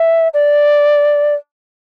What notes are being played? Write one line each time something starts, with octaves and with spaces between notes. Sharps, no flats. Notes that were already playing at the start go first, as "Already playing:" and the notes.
Already playing: E5
D5